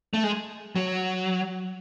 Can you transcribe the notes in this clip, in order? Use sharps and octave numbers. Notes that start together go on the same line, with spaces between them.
A3
G#3
F#3